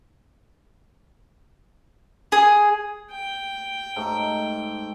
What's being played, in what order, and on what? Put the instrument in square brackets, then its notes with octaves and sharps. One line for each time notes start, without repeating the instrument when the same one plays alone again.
[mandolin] G#4
[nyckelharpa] G5
[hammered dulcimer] G#2 A3